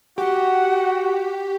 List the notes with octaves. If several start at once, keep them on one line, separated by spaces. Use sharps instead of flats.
F#4 G4 F#5